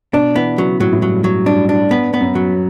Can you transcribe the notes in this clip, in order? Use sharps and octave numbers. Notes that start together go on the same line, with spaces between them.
B2 D4
E3 B3
C#3 F#3
A2 F#3
A2
G2 F#3
F#3
G2 D4
D4
B3
B3
F#2
F#3